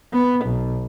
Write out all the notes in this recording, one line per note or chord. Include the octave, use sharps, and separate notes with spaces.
B3
B1